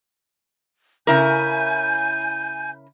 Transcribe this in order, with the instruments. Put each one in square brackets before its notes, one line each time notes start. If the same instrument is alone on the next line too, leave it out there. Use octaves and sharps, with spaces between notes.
[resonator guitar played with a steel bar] C#3 E4 A#4 [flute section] G#5 G6